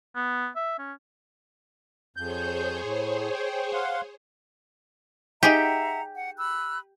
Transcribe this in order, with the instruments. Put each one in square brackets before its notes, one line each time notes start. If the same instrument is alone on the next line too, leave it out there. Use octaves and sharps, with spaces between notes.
[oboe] B3
E5
C#4
[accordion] F2 G6 [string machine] G#4 C5 C#5
[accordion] A2
G5
F5 F#5 C6
[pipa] D#4 G#4 G5 [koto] G4 [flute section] E5 F#5 A#5
[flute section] F#5
B5 E6 F#6